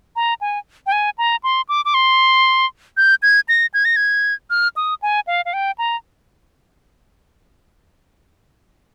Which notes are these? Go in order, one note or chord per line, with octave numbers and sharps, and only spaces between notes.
A#5
G#5
G5
G#5
A#5
C6
D6
D6
C6
G6
G#6
A#6
G#6
A#6
G#6
F6
D#6
G#5
F5
F5
G5
A#5